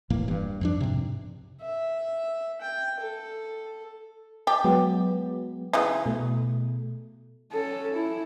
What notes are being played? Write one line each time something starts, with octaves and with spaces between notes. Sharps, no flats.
E1 A2 E3 A#3
G2
F2 F3 D4
G#2 C3
E5
G5
A4
G4 D#5 A5
F#3 G#3 B3
C#3 E3 D#4
B2 A3
C#4 A4
E4